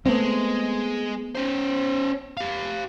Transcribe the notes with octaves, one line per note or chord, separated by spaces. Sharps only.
G#3 A3 B3 C4
C#4 C5
G4 F5